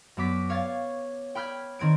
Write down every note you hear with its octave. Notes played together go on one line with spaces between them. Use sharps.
F#2 B3 D6 B6
C#5 F5 G#6 A6
G5 B5 F6 G6 G#6
D#3 C4 G#6 D7